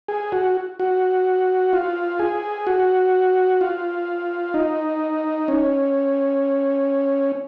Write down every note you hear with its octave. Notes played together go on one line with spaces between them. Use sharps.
G#4
F#4
F#4
F4
G#4
F#4
F4
D#4
C#4